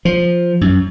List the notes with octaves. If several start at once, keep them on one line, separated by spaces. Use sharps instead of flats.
F3
F#2